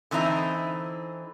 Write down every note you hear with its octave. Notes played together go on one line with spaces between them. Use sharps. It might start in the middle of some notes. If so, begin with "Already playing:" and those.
D3 E3 C4 D#4 E4